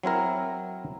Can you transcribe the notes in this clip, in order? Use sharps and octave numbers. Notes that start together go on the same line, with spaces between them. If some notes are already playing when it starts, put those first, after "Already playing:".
F#3 C4 E4 A#4